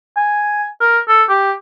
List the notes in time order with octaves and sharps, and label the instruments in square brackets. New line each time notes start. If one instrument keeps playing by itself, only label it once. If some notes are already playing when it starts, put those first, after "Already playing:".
[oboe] G#5
A#4
A4
G4